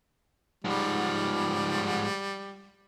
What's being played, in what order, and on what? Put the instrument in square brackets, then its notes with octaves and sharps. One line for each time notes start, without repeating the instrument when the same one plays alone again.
[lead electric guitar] G#2 F3 [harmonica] G3